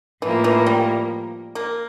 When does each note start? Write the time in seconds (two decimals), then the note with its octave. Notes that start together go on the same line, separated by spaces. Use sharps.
0.21 A2 E3 F3 A#3
0.44 E3
0.66 G3
1.55 A#3